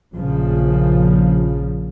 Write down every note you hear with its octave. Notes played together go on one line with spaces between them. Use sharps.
A#1 A#2 C#3 F3